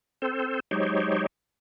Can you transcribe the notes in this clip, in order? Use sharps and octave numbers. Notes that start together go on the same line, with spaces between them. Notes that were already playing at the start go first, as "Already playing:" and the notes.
C4 A4 C5
F#3 G#3 D#4 G4 C5 C#5